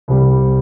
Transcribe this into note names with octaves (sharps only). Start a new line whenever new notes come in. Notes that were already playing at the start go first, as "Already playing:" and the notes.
C2 C3 G3